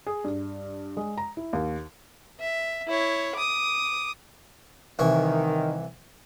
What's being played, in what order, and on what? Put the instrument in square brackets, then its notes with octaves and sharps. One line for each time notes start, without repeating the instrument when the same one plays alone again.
[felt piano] G#4
G2
G#3
A#5
E4
D#2
[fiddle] E5
E4 C#5
D6 D#6
[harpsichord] C2 E3 C#6 [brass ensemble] D#3